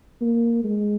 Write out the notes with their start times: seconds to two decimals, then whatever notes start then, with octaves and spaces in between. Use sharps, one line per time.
0.21 A#3
0.64 G#3